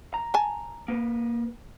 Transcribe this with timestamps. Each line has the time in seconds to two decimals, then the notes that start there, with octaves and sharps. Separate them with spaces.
0.14 A#5
0.34 G#5 A5
0.88 A#3 B4